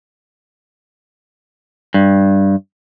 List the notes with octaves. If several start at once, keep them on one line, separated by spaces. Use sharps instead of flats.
G2